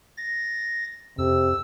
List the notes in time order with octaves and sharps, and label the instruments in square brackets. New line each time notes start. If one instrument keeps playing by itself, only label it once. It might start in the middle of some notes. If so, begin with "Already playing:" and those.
[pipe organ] A6 A#6
[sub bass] F2 [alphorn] C3 [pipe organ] E6